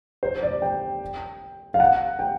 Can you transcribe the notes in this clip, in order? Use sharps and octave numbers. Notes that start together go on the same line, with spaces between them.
C5
D5
G5
F5
F#5
G5